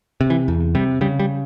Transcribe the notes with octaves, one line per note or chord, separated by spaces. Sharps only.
C3
E3
E2
C3 G3
C#3 G3
G3